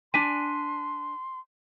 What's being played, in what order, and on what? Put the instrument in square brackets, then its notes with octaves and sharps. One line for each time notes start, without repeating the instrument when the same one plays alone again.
[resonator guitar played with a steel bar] D4 G#5 [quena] C6 [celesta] B6 D#7